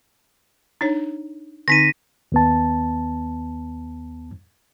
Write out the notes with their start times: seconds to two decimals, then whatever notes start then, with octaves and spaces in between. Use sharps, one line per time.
0.81 D4 D#4 C#5
1.68 D3 C4 D#4 A#6 B6 D#7
2.32 D#2 B3 A5